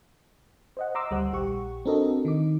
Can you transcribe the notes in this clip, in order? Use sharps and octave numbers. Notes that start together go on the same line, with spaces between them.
C5 D#5 F#5
D#5 A#5 C6 D6 E6
D2 G3 C5 F#5
A#1 G4 F#5 C#6
C4 D4 F#4 A4 A#4 D#5
D#3 D#4 D6